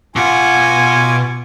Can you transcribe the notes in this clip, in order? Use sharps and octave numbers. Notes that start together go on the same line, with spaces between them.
B2 F4 F#5 G#5 C#6 D6